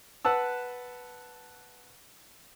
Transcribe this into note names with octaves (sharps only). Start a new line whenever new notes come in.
B4 F#5 A5 E6